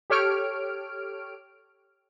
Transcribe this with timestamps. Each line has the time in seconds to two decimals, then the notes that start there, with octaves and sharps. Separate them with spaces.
0.10 G4 A4 C#5 F6 D7